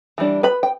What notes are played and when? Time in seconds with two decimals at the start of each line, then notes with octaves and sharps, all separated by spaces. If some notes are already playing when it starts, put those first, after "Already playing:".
0.18 E3 G3 D4
0.43 B4 B5
0.63 G5